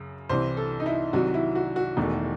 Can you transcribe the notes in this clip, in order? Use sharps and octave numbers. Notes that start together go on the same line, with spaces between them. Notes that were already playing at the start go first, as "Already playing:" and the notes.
Already playing: F#2 C#3
C2 C3 E3 C5
A4
D#4
E4
C2 C3 D#3 F#3 F#4
E4
F#4
F#4
E1 E2 D#3 A3